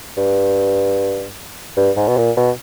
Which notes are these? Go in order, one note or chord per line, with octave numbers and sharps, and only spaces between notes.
G2
G2
G#2
B2
A#2
B2